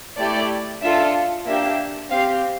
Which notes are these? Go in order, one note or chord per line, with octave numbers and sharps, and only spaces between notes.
A3 E4 G4 D5
D4 F4 A4 E5
A#3 D4 G4 E5
C4 G4 F5